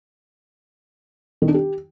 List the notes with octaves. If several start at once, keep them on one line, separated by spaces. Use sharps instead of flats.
D#3
D4
G4